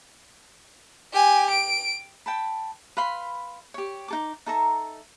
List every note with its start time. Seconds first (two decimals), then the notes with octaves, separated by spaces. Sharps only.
1.13 G4 G#5
1.51 D7
2.26 G5 A5 B5
2.97 B4 F5 B5 C6
3.74 G4 C#5
4.08 D#4 A4 D6
4.46 D#4 A4 E5 A#5